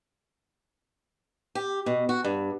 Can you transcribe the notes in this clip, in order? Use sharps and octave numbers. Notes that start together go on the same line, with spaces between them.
G4
B2
F#4
G2